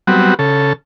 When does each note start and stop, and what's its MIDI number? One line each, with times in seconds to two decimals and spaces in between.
0.07 0.34 54
0.07 0.34 55
0.07 0.34 59
0.07 0.34 60
0.07 0.34 66
0.39 0.73 49
0.39 0.73 69